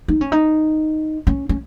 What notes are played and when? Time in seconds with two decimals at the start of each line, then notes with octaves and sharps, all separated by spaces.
0.08 D#4
0.21 C#4
0.32 D#4
1.27 C#4
1.49 C#4